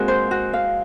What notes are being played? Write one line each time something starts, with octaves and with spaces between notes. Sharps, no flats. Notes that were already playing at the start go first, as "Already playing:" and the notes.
Already playing: G#3 A#3 C4 F#4
C5
F#4
F5